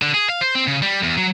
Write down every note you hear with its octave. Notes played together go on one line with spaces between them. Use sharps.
D3
G#4
F5
C5
C4
C#3
G3
E2
F#3